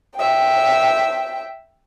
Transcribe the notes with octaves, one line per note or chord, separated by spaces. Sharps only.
E5 G5